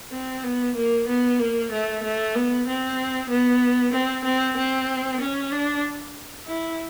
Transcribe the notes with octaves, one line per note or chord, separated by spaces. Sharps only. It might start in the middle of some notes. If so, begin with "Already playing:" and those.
C4
B3
A#3
B3
A#3
A3
A3
B3
C4
B3
C4
C4
C4
C#4
D4
E4